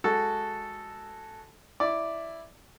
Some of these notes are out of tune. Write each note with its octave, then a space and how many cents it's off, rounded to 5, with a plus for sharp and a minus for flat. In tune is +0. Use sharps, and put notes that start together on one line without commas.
G#3 +0 F#4 +0 A4 +0
E4 +0 D5 +0